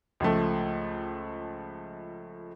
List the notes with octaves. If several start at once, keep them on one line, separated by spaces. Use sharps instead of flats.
C#2 F3 A3